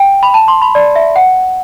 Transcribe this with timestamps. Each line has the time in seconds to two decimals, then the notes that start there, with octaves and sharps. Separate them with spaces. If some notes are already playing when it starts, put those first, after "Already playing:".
Already playing: G5
0.23 B5
0.34 A5
0.48 C6
0.62 B5
0.75 D5
0.96 E5
1.16 F#5